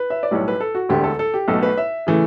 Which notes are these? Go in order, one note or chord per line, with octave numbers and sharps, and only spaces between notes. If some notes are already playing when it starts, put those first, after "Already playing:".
Already playing: B4
E5
D5
B1 A2 G3 C#5
B4
A4
F#4
E1 D2 D3 A3 G4
A4
A4
G4
B1 B2 A3 A4
B4
E5
C#3 E3 A3